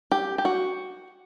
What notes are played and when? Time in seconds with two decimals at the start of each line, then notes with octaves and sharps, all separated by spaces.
0.11 G4
0.38 G4
0.45 F#4